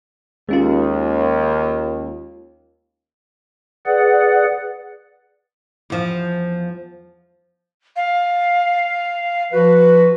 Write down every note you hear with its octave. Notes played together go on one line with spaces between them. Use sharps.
D#2 G#3 C#4 F4
G#4 B4 D5 F#5
E2 F3
F5
F3 F#4 B4